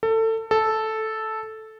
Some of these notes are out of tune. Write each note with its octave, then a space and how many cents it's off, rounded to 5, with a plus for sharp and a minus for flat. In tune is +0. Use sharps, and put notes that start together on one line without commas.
A4 +25
A4 -5